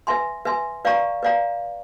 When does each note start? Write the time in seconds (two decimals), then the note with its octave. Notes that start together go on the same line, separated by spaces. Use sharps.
0.07 B4 E5 G#5 C6
0.45 B4 E5 G#5 C6
0.85 B4 D5 F5 A#5 C#6
1.23 B4 D5 F5 A#5